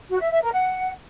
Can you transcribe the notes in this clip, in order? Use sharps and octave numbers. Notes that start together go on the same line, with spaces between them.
F#4
E5
E5
A#4
F#5